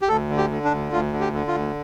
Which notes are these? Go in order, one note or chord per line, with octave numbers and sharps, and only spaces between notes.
G4
D2 A4
D3
G4
D3
D4
D2
D2 F4
D3
G4
D3
F4
D2